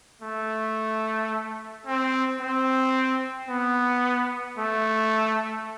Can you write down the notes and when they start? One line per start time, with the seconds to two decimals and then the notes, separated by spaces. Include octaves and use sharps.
0.22 A3
1.86 C4
2.40 C4
3.49 B3
4.58 A3